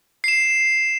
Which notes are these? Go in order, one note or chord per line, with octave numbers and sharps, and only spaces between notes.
C7 E7